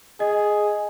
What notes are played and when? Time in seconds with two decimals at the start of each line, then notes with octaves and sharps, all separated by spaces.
0.20 G#4 D#5